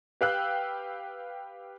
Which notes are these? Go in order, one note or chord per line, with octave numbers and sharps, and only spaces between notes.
G4 B4 F5 G5 E6 F#6